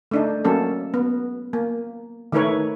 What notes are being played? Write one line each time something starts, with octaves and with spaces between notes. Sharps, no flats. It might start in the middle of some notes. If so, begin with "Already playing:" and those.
A3 D4 D#4
F#3 A#3 C#4 A4
B3
A#3
D#3 A3 E4 A#4 B4 C#5